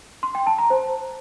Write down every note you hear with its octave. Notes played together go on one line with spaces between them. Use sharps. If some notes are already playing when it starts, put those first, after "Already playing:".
C6
G5
A5
A#5
C5